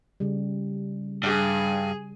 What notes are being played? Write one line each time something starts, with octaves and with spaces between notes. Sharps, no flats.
C#3 G3
G2 G#4